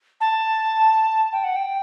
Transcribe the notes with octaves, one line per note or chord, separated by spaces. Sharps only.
A5
G5
F#5
G5